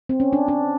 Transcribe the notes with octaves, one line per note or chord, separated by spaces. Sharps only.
C4
C#4
D4
D4